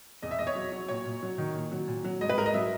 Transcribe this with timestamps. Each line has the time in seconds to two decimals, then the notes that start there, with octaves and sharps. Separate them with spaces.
0.22 E2 D#5
0.31 E5
0.39 E2 D#5
0.47 C#5
0.55 F#3
0.72 F#3
0.88 A#2 C#5
1.05 A#2
1.22 F#3
1.38 D#3
1.55 A#2
1.72 F#3
1.88 A#2
2.04 F#3
2.21 G#2 D#5
2.29 B4
2.38 G#2 A#4
2.46 D#5
2.54 F#3 E5